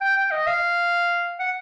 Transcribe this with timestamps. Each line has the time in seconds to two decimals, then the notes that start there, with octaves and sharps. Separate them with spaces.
0.01 G5
0.16 G5
0.31 D#5
0.47 F5
1.39 F#5